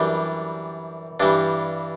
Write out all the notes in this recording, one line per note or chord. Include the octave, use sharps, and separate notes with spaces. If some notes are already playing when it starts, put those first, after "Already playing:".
Already playing: F#2 E3 G3 D4
G2 E3 G3 D4